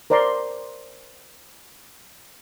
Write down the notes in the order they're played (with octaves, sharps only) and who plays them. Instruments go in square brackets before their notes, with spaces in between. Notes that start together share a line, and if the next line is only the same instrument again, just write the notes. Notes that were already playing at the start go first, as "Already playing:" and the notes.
[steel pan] A#4 C5 D5 A#5 C6